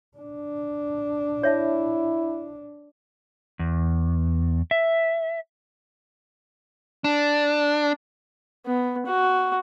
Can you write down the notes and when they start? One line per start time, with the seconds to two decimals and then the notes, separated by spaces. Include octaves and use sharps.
0.17 D4
1.43 E4 C#5 E5 A5
3.59 E2
4.71 E5
7.04 D4
8.66 B3
9.06 F#4